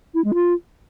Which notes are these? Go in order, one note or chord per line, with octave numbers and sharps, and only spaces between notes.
E4
G#3
F4